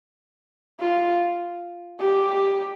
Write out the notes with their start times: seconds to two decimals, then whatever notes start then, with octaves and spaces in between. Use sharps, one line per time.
0.81 F4
2.00 G4